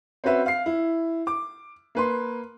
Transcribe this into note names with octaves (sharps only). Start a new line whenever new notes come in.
C4 C#4 F#4 B4 E5
F5 C7
E4
D6
A#3 B4 C6